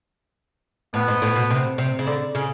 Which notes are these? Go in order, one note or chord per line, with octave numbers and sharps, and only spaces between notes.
A2 B3
G#2
A2
B2
C3
C3
C#3
D3
C#3